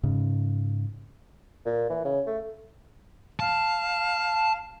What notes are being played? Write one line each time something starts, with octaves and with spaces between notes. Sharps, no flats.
G#2 C#3
A#2
E3
C#3
A3
F5 A5